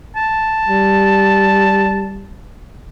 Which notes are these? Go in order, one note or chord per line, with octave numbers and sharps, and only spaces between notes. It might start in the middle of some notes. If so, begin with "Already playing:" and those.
A5
G3